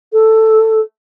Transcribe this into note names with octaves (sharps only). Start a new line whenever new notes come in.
A4